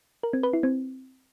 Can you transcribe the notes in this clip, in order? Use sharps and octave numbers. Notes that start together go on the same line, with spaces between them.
A#4
C4
B4
E4
C4